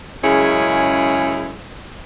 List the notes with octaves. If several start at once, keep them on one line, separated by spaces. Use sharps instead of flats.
F#2 C#3 G#3 E4 G#4 C#5